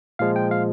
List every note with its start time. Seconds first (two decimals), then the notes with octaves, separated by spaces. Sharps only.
0.19 A#2 F3 G#3 F5
0.36 G5
0.51 F5